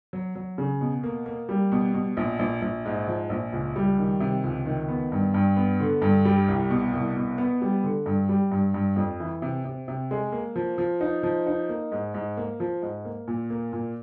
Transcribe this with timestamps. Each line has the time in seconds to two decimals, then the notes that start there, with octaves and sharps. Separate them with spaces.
0.13 F#3
0.35 F#3
0.58 C#3
0.81 B2
1.03 A#3
1.26 A#3
1.49 G3
1.72 B2
1.94 B2
2.17 A#1
2.39 A#1
2.62 A#1
2.85 G#2
3.08 F3
3.30 A#1
3.52 C#2
3.76 G3
3.98 D#3
4.20 C3
4.44 C#2
4.66 D#3
4.88 B3
5.12 G2
5.34 G2
5.57 B3
5.80 D3
6.02 G2
6.25 G3
6.48 C2
6.70 B2
6.93 C2
7.16 B2
7.38 B3
7.62 G3
7.84 D3
8.06 G2
8.29 G3
8.51 G2
8.74 G2
8.96 F2
9.20 E3
9.42 C3
9.65 C3
9.88 C3
10.11 G#3
10.32 A#3
10.56 F3
10.78 F3
11.01 D#4
11.23 F3
11.47 D#4
11.69 A#3
11.92 G#2
12.14 G#2
12.37 A#3
12.60 F3
12.82 G#2
13.05 A#3
13.28 A#2
13.50 A#3
13.73 A#2